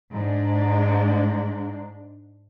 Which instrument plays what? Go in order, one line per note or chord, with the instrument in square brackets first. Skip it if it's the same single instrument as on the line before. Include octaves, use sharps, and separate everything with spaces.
[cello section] G#2 D4